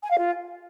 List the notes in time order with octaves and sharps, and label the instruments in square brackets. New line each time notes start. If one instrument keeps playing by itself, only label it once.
[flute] G#5
F5
F4